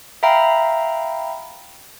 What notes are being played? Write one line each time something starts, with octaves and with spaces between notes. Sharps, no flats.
E5 F5 G5 A#5 B5